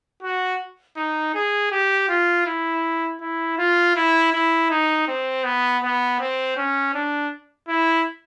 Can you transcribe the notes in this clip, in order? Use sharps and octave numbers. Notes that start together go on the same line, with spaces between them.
F#4
D#4
G#4
G4
F4
E4
E4
F4
E4
E4
D#4
C4
B3
B3
C4
C#4
D4
E4